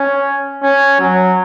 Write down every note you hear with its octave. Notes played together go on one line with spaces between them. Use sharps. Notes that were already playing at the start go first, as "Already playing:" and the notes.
Already playing: C#4
C#4
F#3